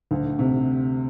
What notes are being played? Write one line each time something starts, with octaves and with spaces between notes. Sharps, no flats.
D2
C3